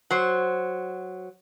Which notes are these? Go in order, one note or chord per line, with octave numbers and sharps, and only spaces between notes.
F#3 C5